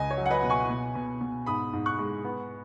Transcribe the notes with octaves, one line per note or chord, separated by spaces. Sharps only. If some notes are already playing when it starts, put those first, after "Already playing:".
Already playing: C#2 D#5 G#5
C#5
F#3
F#5
B4 D#5
B2
G#5 C#6
B2
B2
B2
G#2 B5 D#6
G#2
C#6 F#6
G#3
B3